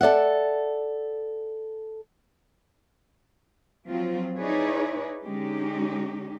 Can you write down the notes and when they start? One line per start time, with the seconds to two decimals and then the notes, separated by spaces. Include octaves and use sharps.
0.01 A4 D5 E5 F#5
3.88 F3 F#3 C4 F4
4.36 D#4 E4 G#4 B4 C#5 D5
5.21 D3 G#3 C#4 D#4 G4